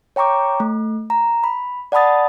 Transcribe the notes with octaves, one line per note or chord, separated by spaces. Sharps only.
C#5 G5 A#5 C#6 D6
A3
A#5
B5
D5 F#5 A5 B5 D#6 A6